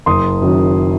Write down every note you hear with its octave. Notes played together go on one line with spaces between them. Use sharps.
F#1 C6 D#6
F#2 D#3 F#3